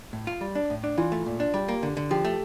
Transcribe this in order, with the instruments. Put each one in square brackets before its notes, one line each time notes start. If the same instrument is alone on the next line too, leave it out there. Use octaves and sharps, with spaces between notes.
[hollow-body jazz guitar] A2
F4
G3
D4
A2
D4
[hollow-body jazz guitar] E3 [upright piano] F4
[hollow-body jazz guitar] A3
A#2
D4
[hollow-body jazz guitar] G3 [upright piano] G4
[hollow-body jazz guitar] A#3
D3
D3
[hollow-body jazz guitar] F3 [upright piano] G4
[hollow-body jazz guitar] A3